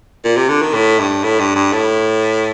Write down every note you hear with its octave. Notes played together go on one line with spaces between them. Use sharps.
A#2
C3
D3
D#3
A2
G2
A2
G2
G2
A2